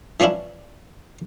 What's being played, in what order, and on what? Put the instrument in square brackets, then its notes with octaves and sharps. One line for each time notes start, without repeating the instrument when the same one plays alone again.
[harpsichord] E3 F3 C#4 D4 E4